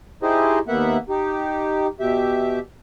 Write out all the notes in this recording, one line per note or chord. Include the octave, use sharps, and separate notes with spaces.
D#4 E4 G4 G#4 C5 D#5
D#2 A#3 B3 E5 F#5
D#4 G4
B2 G4 E5